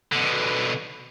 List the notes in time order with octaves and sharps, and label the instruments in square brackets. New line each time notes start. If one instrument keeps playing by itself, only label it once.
[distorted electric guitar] B2 D3